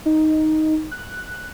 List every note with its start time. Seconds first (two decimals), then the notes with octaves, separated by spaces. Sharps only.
0.06 D#4
0.91 F#6